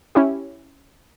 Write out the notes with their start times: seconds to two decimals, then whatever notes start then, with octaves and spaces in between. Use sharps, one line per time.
0.15 C#4 E4 G4